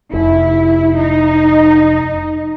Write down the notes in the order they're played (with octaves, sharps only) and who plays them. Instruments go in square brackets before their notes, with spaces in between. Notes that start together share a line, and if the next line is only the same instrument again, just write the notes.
[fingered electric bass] F1 [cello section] E4
[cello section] D#4